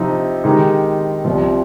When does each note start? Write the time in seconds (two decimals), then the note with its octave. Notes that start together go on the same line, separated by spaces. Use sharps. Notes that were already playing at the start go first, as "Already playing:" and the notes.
Already playing: C3 F3 C4 D#4
0.44 D#3 G#3 D#4 G4
1.25 C2 C3 F3